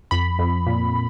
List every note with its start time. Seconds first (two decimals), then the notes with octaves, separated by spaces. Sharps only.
0.11 F2 B5
0.39 F2
0.67 A#2